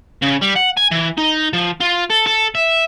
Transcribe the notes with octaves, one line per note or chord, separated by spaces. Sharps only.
C#3
G3
F#5
G#5
E3
D#4
F3
F4
A4
A4
E5